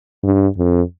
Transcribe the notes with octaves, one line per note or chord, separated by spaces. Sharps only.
G2
F2